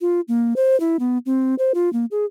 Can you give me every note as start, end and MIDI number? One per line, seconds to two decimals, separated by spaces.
0.01 0.21 65
0.28 0.54 58
0.56 0.79 72
0.80 0.97 64
1.00 1.18 59
1.26 1.55 60
1.59 1.72 72
1.75 1.92 65
1.93 2.05 58
2.11 2.25 68